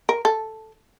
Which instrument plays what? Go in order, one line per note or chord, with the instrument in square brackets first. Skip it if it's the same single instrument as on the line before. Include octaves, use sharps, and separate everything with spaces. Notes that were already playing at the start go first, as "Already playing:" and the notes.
[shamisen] A#4
A4